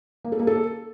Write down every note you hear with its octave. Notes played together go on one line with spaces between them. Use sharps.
A#3
A4
A#3
A4